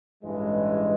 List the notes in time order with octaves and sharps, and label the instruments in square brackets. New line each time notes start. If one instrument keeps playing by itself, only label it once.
[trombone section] A1 G2 E3 G#3